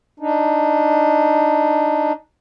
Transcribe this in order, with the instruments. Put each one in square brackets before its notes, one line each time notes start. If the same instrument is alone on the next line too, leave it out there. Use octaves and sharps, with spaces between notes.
[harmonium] D4 D#4